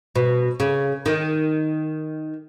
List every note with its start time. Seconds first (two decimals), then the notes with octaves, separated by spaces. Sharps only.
0.16 B2
0.60 C#3
1.06 D#3